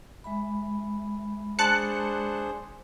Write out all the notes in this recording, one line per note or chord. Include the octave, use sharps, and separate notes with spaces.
G#3 E5 B5
D4 G#4 C5 A5 F#6 C#7